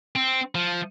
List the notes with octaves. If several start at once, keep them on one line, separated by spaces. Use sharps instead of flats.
C4
F3